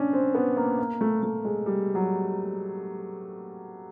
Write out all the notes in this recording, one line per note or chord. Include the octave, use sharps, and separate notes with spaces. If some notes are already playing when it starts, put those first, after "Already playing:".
Already playing: C#4 D4
C4
B3
A#3
A#3
A3
A3
G#3
G3
F#3